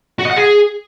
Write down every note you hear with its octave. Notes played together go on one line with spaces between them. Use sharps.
F#4
D#5
F#5
G#4